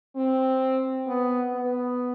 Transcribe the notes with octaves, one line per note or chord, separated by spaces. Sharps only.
C4
B3
B3